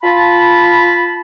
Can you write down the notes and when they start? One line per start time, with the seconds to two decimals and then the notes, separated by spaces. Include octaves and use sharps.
0.02 F4 A5 B5